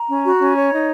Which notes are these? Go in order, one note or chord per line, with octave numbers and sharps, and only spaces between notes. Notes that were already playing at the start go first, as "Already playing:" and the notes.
Already playing: A#5
C#4
F#4
C#4
C#5
D#4